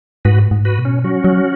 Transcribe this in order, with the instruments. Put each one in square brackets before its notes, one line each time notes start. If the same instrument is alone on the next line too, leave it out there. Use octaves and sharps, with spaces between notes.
[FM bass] G#2 [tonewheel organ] F#4 B4
[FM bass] G#2
[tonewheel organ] F#4 B4
[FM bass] B2
[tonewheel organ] C#4
[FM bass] F#3 [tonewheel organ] C#4 F#4
[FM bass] F#3